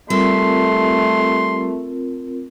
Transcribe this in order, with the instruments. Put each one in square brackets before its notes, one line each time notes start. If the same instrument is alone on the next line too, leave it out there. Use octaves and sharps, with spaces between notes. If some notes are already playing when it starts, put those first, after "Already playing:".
[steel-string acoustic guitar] G3 A4 E5 [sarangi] A3 [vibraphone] C4 F4 A#4 [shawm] C6